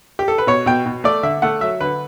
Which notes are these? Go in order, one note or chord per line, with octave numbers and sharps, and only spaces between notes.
G4
A4
B4
B2 C#5
B2 G5
B2
A3 D5
D3 E5
A3 F#5
F#3 E5
D3 B4